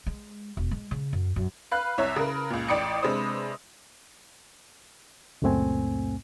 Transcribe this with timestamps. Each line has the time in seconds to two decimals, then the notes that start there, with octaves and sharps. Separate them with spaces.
0.07 G#3
0.57 E1
0.71 G#3
0.91 C#3
1.13 F#2
1.36 F#2
1.71 B4 F5 F#6
1.98 C2 C#5 E5 A#5
2.16 C#3 A#4 B4
2.50 C#2 A#2
2.69 A1 D5 G5 D#6 C#7
3.02 C3 G#3 D4 B4 C5 D#6
5.42 C#2 F#2 A#2 A3 C4 G#5